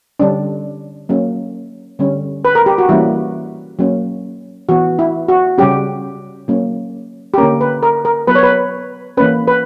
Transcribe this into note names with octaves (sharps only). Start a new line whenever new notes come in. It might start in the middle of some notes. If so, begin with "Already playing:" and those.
D3 G3 C#4 D4
F#3 A#3 C#4
D3 G3 C#4
B4
A#4
G4
F#4
E3 G3 A#3 C#4 E4
F#3 A#3 C#4
E3 B3 F#4
E4
F#4
C#3 G3 C#4 G4
F#3 A#3 C#4
G4
D3 A#3 C#4 A#4
B4
A#4
A#4
F#3 B3 B4
C#5
B4
E3 A#3 C#4 B4
B4